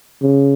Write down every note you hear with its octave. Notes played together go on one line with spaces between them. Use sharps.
C#3